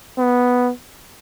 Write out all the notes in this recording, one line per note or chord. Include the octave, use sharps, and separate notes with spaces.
B3